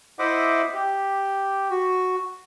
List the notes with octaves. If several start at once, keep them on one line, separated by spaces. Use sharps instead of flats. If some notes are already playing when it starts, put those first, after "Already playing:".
E4 C5 D#5 E5 F#5 D6
G4
F#4